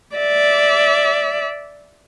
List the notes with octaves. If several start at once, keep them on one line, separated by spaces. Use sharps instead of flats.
D5 E5